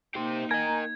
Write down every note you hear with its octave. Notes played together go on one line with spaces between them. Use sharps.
A#3 D#4 G4 C5
A#4 D#5 G#5 A#5 G#6